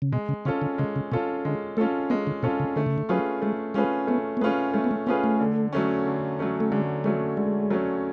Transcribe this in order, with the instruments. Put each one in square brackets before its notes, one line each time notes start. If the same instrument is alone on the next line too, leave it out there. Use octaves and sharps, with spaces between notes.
[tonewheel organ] C#3
[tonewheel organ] B2 [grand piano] G#3
[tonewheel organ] C#3
[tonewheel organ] C#3 [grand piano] C#4 F4 A4
[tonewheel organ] D3
[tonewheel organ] C#3 [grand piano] G#3
[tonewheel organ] C#3
[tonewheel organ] B2 [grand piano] C#4 F4 A4
[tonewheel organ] D3 [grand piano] G#3
[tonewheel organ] A3 [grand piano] C#4 F4 A4
[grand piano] G#3 [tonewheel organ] B3
[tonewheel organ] D3
[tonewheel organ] B2 [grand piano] C#4 F4 A4
[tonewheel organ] C#3
[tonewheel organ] D3 [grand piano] A3
[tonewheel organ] C#3
D3
[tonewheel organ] F#3 [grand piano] C#4 F4 G#4 B4
[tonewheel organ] G#3 [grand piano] A3
[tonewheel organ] G#3 [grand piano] C#4 F4 G#4 B4
[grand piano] A3 [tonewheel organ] B3
[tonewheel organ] B3
[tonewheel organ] A3 [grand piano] C#4 F4 G#4 B4
[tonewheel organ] G#3 [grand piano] A3
[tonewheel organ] B3
A3
[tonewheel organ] B3 [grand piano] C#4 F4 G#4 B4
[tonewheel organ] A3
[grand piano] D3
F#3 A3 C#4
D3
F#3 A3 C#4
[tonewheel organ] A3
[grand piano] D3 [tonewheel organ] G#3
[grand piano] F#3 A3 C#4 [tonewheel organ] G#3
[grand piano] D3 [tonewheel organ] G#3
[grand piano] F#3 A3 C#4